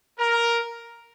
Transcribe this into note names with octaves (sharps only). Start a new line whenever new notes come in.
A#4